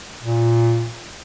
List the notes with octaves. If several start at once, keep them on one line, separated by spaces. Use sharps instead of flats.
A#2